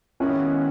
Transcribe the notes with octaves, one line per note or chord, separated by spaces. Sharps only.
D#2 D#3 G#3 B3 C#4 E4 F#4